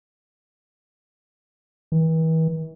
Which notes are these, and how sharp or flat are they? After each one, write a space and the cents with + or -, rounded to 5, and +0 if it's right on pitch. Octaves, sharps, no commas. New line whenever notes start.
E3 -40